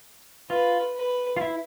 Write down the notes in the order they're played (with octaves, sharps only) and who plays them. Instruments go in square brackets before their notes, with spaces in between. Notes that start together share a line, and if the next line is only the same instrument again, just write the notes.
[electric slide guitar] F4 [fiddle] B4
[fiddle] B4
[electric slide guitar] F4
E4